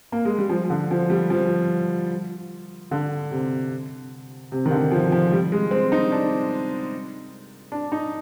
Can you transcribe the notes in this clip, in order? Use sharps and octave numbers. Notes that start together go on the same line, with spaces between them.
A#3
G#3
G3
F3
D3
F3
G3
F3
D3
C3
C3
D#3
D3
F3
F3
G3
G#3
C4
D#4
D4
D4
D#4